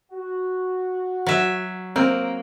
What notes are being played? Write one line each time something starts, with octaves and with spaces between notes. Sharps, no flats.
F#4
F#3 E5
A#3 C4